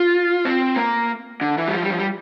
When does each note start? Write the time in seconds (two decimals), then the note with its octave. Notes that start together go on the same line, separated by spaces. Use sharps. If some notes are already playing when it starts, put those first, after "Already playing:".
Already playing: F4
0.45 C4
0.76 A#3
1.41 D3
1.58 E3
1.68 G3
1.74 F3
1.83 G3
1.90 F3
1.98 G3